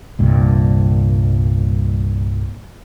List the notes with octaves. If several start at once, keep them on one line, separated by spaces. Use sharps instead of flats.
C2 G2 A#2